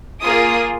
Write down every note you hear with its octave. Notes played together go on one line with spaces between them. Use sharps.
A#3 F4 G#4 D#6